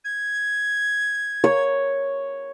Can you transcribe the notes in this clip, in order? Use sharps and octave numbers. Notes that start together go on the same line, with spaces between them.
G#6
C#5